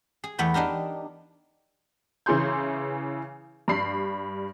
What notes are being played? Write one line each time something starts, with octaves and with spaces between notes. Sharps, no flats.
G#4
E2 A3 B3 G5
D4 D#4 G4 A#4
C#3 E3 G#4 C6 G6
G2 G3 B5 C7